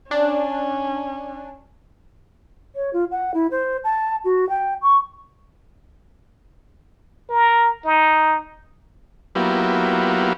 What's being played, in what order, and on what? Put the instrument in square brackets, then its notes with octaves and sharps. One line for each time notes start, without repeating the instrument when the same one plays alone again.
[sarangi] C#4 [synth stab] D4
[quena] C#5
F4
F#5
E4
C5
A5
F#4
G5
C#6
[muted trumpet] A#4
D#4
[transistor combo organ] F#3 A#3 B3 E4 F4 G4